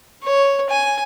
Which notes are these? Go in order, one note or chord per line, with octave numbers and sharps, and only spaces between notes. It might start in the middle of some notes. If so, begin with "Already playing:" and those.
C#5
G#5